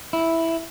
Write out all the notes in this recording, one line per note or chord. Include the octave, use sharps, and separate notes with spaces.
E4